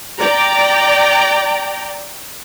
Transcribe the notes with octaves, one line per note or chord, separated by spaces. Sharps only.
D5 G5 A#5